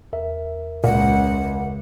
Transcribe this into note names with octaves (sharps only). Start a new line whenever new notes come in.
E2 A#4 E5
C#2 A#2 F#5